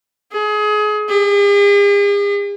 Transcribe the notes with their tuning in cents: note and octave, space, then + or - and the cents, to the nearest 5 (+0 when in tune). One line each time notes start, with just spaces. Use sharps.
G#4 +25
G#4 -45